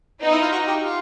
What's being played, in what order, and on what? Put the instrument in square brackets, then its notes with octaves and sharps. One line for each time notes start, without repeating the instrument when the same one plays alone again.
[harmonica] B3 [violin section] D#4
[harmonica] E4
F4
F#4
G4
F4